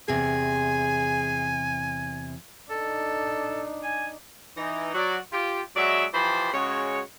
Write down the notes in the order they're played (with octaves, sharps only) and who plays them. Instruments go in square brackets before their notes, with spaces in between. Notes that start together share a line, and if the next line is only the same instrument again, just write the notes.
[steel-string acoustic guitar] E2 C3 [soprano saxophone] G#4 [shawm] G#5
[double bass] D4 D#4 [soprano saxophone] A4
[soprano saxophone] G#5
[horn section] E3 D#4
F#3 F#4 D5
F4 G4
F#3 G#3 F#4 D5 E5
E3 F3 G4 C5 A5 B5
C#3 G#3 F#4 C#5